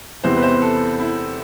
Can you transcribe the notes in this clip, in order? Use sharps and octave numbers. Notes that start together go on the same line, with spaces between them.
E2 C3 E3 C5
B4
C5
A4
E4